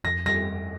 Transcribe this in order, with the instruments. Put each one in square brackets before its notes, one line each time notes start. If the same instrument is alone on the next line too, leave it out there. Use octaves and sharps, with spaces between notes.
[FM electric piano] F2 [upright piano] A#6
[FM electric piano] G3 [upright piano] A#6